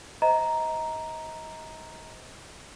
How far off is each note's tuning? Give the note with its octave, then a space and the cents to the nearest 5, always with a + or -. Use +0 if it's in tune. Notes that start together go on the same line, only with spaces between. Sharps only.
C5 -20 D#5 +30 A#5 +0